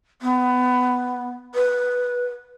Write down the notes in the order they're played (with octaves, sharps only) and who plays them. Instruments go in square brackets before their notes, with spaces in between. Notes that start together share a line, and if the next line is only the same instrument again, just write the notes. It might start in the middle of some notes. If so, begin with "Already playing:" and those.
[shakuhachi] B3
B4